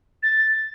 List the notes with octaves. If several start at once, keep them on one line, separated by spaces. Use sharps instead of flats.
A6